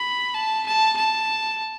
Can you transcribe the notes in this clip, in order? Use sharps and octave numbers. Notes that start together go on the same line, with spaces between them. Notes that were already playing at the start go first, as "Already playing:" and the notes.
Already playing: B5
A5
A5
A5